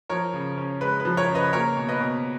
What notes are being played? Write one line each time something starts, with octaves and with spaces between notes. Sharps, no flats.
F3 A#4 C#5
C#3
C#4
G#3 B4
B4
F3
A#4 C#5
C#3
B4 D#5
A#3 A#4 C#5
B2
B4 D#5
B2